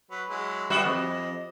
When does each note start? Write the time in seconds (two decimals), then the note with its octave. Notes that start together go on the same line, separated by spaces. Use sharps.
0.11 F#3 B4
0.29 F#3 G#3 E4
0.70 G3 B3 F#4 E5
0.85 F2 D#5